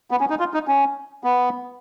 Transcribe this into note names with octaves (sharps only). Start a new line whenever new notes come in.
B3
C#4
D#4
F4
D#4
C#4
B3